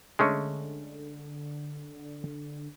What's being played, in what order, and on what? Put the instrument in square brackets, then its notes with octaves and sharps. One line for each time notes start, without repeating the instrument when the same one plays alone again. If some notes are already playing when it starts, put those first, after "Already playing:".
[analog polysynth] D3 [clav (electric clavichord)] G#3 A3 C#4